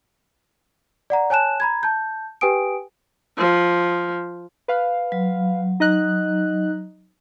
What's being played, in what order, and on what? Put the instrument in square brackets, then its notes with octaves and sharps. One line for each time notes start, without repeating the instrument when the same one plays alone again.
[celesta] D5 F#5 A#5
C#5 G#5 A5 F#6 E7
A#5 B5 G#6
A5 G6
G4 B4 G5 G#5 D#6 D7
[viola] F3
[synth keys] B4 F5
[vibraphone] F#3
[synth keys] D#4 D#5 F#6